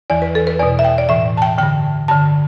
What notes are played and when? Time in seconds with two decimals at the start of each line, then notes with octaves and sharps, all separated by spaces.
0.10 E2 E3 D5
0.22 B4
0.35 A4
0.47 B4
0.60 E2 B2 D5
0.79 E5
0.85 G5
0.98 D5
1.09 A2 E3 E5
1.37 A5
1.42 G5
1.58 G2 D3 G5
2.08 G2 D3 A5